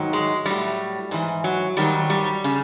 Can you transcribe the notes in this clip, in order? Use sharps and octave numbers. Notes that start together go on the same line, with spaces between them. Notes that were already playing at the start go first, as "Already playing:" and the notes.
Already playing: G#2 D#3 F#3
G#3
A2 F#3 G3
G#2 E3
F#3
G#2 D#3 F#3 G3
G3
C#3